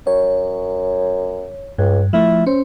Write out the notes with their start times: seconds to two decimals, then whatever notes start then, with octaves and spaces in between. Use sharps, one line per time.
0.07 F#2 C#5
1.78 C#2 G2
2.13 F3 A3 E4
2.46 C#4 C5